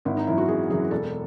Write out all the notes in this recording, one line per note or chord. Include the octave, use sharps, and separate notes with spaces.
G#1 E4
D#4
F#2 E3 E4
F#4
G#1 G#4
F#2 E3 G#4
E1 A4